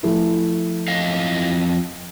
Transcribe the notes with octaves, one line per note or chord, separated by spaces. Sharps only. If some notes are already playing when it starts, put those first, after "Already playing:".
F3 A3 E4
F2 D#5 F5